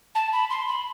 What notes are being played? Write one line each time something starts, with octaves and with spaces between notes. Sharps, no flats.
A5
B5
C6
B5